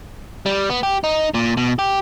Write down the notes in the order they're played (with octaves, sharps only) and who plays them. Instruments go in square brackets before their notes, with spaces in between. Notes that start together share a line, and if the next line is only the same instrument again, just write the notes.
[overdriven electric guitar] G3
B3
G4
D#4
A#2
B2
G4